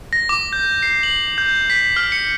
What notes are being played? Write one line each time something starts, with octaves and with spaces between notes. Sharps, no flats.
A#6
D6
G6
C7
F#7
G6
B6
F6
C#7